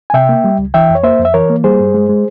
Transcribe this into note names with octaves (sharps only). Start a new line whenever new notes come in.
G#5
C3 E5 G5
A#3
G3
C#2
E3 E5 G5
F2
C#5
A#3 C5 E5
F2
E5
E3 A#4 C#5
A#3
G3 G#4 C5
G2
G#3
G#3